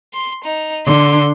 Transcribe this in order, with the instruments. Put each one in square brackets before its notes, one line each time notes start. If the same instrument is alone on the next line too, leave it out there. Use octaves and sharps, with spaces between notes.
[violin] C6
D#4
[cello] D3 [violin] C6